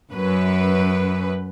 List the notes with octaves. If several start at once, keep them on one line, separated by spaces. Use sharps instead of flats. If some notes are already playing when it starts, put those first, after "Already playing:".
F#2 B4